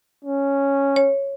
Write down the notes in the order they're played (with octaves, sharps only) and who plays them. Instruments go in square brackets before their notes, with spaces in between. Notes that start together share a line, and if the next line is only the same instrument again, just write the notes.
[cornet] C#4
[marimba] C#5